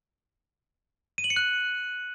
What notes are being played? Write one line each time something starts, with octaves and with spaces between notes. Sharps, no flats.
D#7
F#7
C#7
F#6